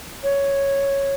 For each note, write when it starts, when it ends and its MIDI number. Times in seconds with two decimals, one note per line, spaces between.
0.23 1.15 73